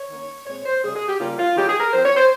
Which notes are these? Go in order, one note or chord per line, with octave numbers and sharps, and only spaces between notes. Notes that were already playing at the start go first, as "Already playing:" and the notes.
Already playing: C#5
D#3 A#3 C#4
A#2 G#3 C4 C#5
C5
C3 G3 C#4 G#4
G#4
G4
C#3 G3 A#3 C#4 F4
F4
D#3 G#3 C#4 G4
G#4
A#4
F3 C4 C5
C#5
C5